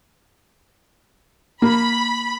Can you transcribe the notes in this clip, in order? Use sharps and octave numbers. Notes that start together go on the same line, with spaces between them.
A#3 B5